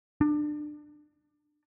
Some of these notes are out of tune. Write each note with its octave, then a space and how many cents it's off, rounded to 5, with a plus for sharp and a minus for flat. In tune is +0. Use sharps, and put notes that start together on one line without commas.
D4 +25